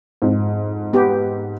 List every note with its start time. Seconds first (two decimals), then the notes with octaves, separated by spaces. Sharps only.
0.22 F2 G#2
0.93 B3 G4